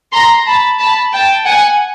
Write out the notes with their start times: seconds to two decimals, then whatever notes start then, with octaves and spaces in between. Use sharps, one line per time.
0.12 A#5 C6
0.46 A5 B5
0.79 A5 B5
1.12 G5 A5
1.45 F#5 G#5